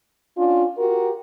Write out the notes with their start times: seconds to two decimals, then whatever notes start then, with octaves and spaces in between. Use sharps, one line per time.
0.36 C#4 D4 F4
0.77 F#4 G4 A#4